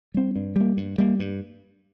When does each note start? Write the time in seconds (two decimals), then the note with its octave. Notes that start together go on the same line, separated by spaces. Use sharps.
0.14 G3 C4
0.36 G2
0.56 G3 A#3
0.77 G2
0.98 G3 A#3
1.19 G2